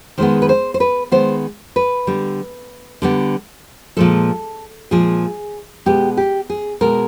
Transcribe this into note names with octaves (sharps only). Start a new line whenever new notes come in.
D#3 G#3 B3 C5
B4
C5
C5
B4
D#3 G#3 B3 C5
B4
D3 G3 B3
D3 G3 B3
A#2 F3 G#3 A4
A#2 F3 G#3 G#4
B2 G#3 B3 G4
G4
G#4
B2 G#3 B3 A#4